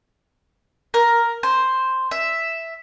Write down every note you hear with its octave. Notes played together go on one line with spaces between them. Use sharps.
A#4
C5
E5